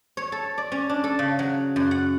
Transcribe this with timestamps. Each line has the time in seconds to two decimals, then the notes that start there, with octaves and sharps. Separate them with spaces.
0.17 C#5
0.32 A4
0.58 D5
0.72 C#4
0.89 D4
1.04 A4
1.19 C#3
1.39 F#3
1.76 F#2
1.91 F#5